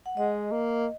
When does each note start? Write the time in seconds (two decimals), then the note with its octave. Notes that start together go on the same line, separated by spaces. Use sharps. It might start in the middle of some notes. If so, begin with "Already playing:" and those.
0.06 F#5
0.17 G#3 D#5
0.51 A#3